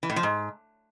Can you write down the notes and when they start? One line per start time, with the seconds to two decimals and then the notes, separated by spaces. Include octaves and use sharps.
0.03 E3
0.10 A2
0.16 F3
0.23 G#2